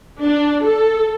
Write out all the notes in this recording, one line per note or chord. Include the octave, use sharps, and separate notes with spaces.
D4
A4